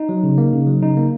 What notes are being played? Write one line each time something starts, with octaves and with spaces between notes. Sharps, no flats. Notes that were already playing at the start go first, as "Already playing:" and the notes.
Already playing: D#4
F#3
C#3
A#3
C#3
F#3
C#3 D#4
A#3